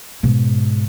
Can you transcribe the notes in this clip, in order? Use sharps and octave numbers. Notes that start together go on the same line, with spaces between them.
G#2 B2